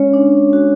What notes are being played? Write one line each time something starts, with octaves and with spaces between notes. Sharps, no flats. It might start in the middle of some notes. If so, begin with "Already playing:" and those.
Already playing: G#3 C#4 C#5
D4
F#4